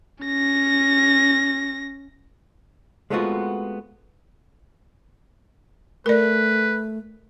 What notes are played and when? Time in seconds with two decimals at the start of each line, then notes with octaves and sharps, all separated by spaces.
0.24 C#4 A#6
3.10 G#3 A3 B3 C4 F4 F#4
6.06 A3 A#4 B4 D5